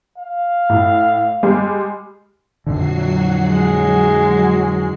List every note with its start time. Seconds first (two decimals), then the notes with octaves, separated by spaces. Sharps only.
0.18 F5
0.70 A2
1.43 G3 G#3
2.67 F2 A#2 D3 F#3 F#4 C7
3.50 G#3